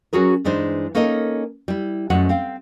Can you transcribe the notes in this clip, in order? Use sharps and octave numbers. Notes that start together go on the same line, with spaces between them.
F#3 C#4 F#4 G#4 A#4
G2 E3 G#3 D4 D#4 C5
A#3 C#4 D#4 A4 A#4 D#5
G3 E4
F#2 G#3 A3 F#5
C4 F5 G5